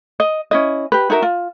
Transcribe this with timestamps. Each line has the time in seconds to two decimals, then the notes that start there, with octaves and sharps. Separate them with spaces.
0.20 D#5
0.51 C#4 E4 D#5
0.92 G4 B4
1.10 D#4 F#4 A#4 E5
1.22 F4